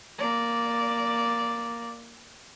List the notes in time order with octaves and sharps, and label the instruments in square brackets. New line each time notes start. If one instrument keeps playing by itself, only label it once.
[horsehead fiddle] A#3 D5